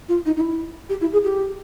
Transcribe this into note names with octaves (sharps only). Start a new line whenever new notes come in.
F4
D#4
D#4
E4
G4
E4
G#4
G4